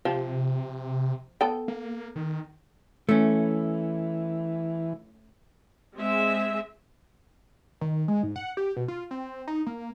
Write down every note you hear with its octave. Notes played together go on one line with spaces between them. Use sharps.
C3 F3 G4
B3 A4 G5
A#3
D#3
E3 A3 C#4
G#3 C4 E5
D#3
G#3
G#2
F#5
G4
B2
F4
C4
D#4
A#3